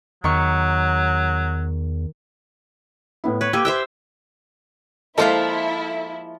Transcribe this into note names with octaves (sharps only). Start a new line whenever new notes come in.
E2 D#3 F#3 C#6
A2 B3 E4
B4 C#5
A#3 G4 E6 G#6 D#7
C5 E5 G5 E6 F#6
F3 G#3 A#3 E4 F4 A4 C5 F5